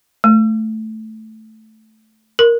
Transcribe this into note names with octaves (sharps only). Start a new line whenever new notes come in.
A3
A#4